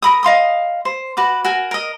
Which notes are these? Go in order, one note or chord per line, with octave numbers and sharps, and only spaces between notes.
A#4 B5 D#6
D#5 F5 C6 D#6
C5
F#4 B4 D6
F#4 A#4 G#5
A#4 D#5